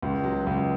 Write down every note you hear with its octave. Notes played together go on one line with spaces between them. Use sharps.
C#2
F#3
C#2